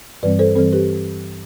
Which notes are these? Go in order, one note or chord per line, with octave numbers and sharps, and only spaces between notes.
G2 E3 G3 C4 B4 D5
A4 C5
G2 E3 G3 C4 A4 C5
G4 B4